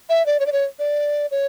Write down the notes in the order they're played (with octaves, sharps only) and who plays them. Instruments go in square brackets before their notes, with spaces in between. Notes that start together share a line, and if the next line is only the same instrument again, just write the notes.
[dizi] E5
D5
C#5
D5
C#5
D5
C#5